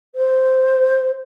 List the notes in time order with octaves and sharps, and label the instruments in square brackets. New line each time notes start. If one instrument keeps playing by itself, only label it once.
[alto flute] C5